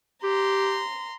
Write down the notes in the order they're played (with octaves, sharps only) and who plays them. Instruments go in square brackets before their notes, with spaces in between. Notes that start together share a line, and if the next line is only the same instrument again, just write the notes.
[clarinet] G4 [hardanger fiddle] A#5 C6